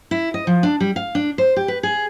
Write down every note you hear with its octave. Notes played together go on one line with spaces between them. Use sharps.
E4
D#5
F3
D4
G3
F5
D4
C5
G4
B4
G#4